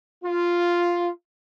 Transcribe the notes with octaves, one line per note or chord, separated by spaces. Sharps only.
F4